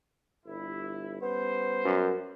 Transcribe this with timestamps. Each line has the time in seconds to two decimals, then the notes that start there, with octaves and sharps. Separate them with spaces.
0.45 G1 E4
1.22 G3 B3 C#4 C5
1.85 F#2